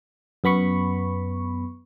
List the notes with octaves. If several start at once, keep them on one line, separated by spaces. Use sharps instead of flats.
F#2 B3 B5 C#6